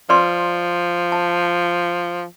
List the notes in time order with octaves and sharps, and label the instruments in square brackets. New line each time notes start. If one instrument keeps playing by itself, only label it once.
[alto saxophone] F3 [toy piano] B4 D5 C6
[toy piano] A5